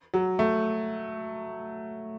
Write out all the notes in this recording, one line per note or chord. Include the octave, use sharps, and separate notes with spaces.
F#3
A3